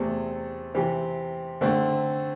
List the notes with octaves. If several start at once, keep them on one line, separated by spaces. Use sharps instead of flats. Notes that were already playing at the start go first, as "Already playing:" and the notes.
Already playing: E2 C3 A3 C4
C3 E3 C4 G4
D3 A3 C4